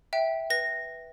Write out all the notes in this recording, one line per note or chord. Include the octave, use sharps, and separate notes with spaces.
E5 G5
B4 A#6